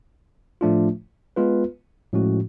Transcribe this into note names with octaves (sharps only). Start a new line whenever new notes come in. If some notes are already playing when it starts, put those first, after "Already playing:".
A2 F3 A3 D4 F4
G#3 B3 F4 B4
A2 F3 G#3 C#4 F#4